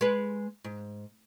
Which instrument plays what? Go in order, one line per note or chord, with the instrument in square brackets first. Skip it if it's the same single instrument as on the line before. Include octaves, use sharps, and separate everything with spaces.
[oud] G#3 B4
G#2